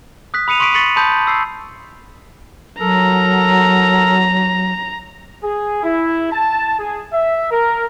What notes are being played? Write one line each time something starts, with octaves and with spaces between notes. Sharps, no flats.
D#6 F#6 B6
B5 D#6 C#7 D#7 F7
C6 C#6 D#6 B6 D7 D#7
C#6 A6 B6 C#7 F#7
A5 B5 C6 D#6 G6
E6 C7
F#3 A4 A#4 A#5
G#4
E4
A5
G#4
E5
A#4